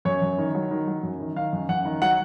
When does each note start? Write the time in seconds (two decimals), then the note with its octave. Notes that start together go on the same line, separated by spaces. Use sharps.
0.05 F#2 C#5
0.22 F#2
0.38 D#3
0.55 F#3
0.71 D#3
0.87 F#3
1.03 F#2
1.20 D#3
1.36 D#3 F5
1.53 F#2
1.69 F#2 F#5
1.85 D#3
2.02 F#3 F#5